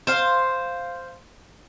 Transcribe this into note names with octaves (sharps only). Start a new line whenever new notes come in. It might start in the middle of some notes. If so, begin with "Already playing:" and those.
C5 F5